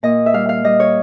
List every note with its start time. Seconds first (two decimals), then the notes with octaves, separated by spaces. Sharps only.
0.03 A#2 D#5
0.26 E5
0.33 G3 F5
0.49 F5
0.64 G3 D#5
0.80 C#5